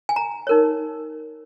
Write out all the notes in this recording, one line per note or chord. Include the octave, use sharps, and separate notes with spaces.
G#5
A#5
D#4 A#4 C#5